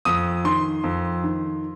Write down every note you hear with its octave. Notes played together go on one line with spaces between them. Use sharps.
F2 D#6
D#3 C6
F2
D#3